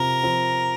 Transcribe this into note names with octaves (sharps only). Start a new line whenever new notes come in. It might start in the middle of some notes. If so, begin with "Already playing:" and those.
Already playing: C3 F3 C4 A#4
F3 C4